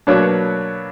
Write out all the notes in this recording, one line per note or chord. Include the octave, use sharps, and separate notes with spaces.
B2 F#3 A#3 D4 B4 C#5